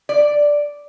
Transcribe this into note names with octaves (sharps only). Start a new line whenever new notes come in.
D5